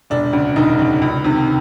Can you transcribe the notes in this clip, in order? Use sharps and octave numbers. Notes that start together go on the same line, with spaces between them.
E1 D3 D4
D2 C#3
E1 D#3 D#4
D2 C#3
C#2
C3 D#3